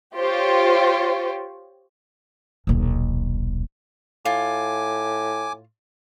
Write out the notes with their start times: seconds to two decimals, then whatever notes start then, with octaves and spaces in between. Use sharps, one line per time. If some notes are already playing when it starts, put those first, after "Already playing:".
0.16 F4 G4 C5 C#5
2.67 D#1 B1
4.25 A2 F4 G#5 D6